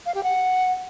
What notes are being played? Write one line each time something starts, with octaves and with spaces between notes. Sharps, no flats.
F5
G4
F#5